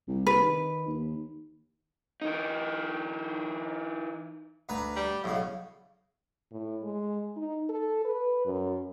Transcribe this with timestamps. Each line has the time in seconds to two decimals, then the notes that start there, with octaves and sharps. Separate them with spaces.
0.08 C2
0.27 C3 B4
0.42 D#3
0.87 D#2
2.22 E3 D#4
4.69 D2 B4 A#5
4.96 G3
5.24 B1 A2 C#3
6.52 A2
6.83 G#3
7.36 D#4
7.69 A4
8.05 B4
8.46 F#2